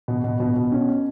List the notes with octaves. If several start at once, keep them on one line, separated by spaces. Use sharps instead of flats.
B2
B2
B2
B2
C#4